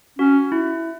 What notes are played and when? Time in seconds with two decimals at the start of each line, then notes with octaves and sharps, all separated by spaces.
0.19 C#4 F#4
0.52 E4